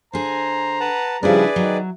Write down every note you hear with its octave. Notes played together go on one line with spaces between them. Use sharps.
D3 G#4 C5 A#5
B4 F#5 A5
C#3 F3 G3 D4 E4 G#4 B4 D5
D#3 F#3